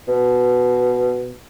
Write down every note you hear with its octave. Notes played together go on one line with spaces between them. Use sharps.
B2